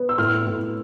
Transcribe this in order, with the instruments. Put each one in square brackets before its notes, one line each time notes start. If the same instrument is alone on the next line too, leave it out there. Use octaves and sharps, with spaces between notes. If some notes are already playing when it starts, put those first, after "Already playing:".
Already playing: [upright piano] B3
E6
A2 F6
A2